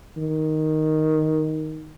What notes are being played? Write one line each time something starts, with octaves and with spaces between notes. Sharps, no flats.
D#3